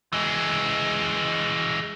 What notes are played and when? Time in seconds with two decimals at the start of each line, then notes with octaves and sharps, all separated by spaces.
0.13 E3 G#3